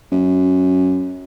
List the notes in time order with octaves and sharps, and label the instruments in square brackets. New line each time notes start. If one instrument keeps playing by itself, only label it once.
[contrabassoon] F#2